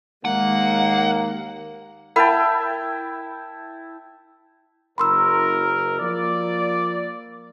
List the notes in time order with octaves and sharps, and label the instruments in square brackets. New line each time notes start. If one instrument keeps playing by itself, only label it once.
[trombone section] D#2 A#3 [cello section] G#3 [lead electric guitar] F#5
[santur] E4 G5 A5 [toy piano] A#4 F#5 B5
[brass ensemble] F#1 A#4 [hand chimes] B5 C6 E6
[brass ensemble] F3 A#3 D5